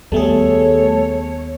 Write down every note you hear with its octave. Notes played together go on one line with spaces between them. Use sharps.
D#2 G3 A3 B3 G#4 A4 C#5